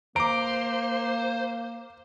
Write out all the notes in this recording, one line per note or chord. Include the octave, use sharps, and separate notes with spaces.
A#3 C5 A#5 D6 D7